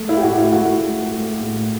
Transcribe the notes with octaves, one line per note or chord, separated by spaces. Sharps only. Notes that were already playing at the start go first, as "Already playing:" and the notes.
Already playing: A3
E4
G4
A2 F#4
E4
A3 F#4
A3
A3
A2